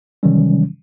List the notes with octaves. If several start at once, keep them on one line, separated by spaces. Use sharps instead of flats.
C3 D#3 E3 F#3 G3 C#4